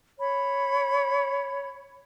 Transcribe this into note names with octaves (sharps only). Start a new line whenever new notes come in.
C#5 B5